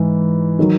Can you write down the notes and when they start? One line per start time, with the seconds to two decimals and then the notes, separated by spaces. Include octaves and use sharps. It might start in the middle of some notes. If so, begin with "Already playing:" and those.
Already playing: G#2 E3
0.59 D#3 F#3